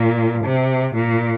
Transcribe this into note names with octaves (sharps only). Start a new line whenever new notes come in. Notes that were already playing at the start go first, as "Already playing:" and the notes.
Already playing: A#2
C3
A#2